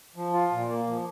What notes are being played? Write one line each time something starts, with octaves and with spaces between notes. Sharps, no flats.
F3
F4
A#2
A#3
F3